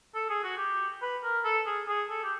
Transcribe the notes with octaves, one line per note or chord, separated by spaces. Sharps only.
A4
G#4
F#4
G4
B4
A#4
A4
G#4
G#4
A4
G4